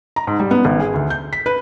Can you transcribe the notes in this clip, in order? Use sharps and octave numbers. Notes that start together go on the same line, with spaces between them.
A#5
G#2
G3
B3
G#1
G#4
D2
G6
B6
B4